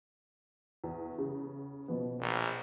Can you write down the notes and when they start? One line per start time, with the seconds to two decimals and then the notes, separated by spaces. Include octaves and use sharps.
0.84 E2
1.18 C#3
1.88 B2 F3 B3
2.20 A#1